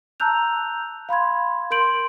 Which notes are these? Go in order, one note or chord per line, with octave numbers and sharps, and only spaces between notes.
A5 A#5 E6 F#6 G6 F7
F5 B5 C6 G#6
A#4 C6 G6 D7 F#7